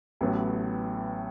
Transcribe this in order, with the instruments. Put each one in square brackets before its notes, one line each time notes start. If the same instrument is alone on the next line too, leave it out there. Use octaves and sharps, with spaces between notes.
[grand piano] A1 A2 F#3 B3